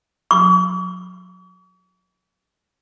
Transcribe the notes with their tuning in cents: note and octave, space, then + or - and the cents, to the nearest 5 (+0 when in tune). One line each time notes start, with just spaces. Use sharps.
C#6 +45